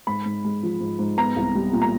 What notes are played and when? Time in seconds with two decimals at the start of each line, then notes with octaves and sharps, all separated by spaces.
0.07 G#2 B5
0.25 G#2
0.44 G#3
0.63 F3
0.81 G#2
0.99 G#2
1.17 B3 A#5
1.37 C2
1.55 G3
1.73 A#2
1.82 A#5